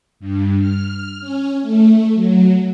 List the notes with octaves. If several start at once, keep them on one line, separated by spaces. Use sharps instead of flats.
G2
F6
C#4
A3
F#3